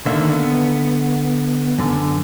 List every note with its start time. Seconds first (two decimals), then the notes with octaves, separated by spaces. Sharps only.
0.06 D3 D#3 A#3 E5
0.32 B3
1.78 F#2 D3